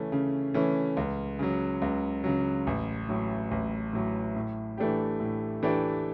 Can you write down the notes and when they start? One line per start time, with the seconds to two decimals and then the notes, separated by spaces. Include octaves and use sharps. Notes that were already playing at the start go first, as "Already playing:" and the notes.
Already playing: C#3 E3 A3 C#4
0.12 C#3
0.54 E3 A3 C#4
0.97 C#2
1.39 C#3 F#3
1.82 C#2
2.24 C#3 F#3
2.67 A1
3.09 A2 F#3
3.51 A1
3.93 A2 F#3
4.36 A2
4.78 E3 A3 D4 G4
5.20 A2
5.63 E3 A3 D4 G4